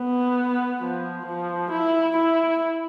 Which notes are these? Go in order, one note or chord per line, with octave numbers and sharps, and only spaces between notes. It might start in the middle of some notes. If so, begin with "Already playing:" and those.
Already playing: B3
F3
F3
E4
E4